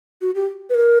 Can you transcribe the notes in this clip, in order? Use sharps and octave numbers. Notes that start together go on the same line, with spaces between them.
F#4
G4
B4
A#4